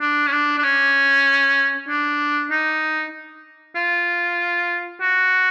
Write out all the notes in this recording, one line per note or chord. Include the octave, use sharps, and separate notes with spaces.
D4
C#4
D4
D4
C#4
D4
D#4
F4
F#4